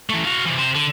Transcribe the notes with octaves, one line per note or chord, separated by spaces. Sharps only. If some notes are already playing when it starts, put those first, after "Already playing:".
E3 A3
F#4 F5
C3 E3
C3 C5
D3